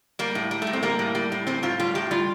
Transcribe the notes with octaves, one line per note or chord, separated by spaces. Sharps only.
G3 A#3
A2
G3
A3
A2
C4
G3 A#3
A2
G3
A2
G3 C4
A2 F4
G3 F4
A2 G4
G3 F4